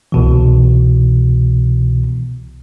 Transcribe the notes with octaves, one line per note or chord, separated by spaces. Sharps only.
C2 B2 E3